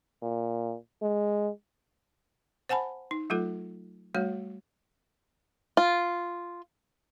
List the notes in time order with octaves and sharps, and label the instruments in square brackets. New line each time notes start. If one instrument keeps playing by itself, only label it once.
[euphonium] A#2
G#3
[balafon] C5 F#5 G#5 A5 B5
D#4
F#3 A3 F4 A4
G3 A3 F#4 C#5
[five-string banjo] F4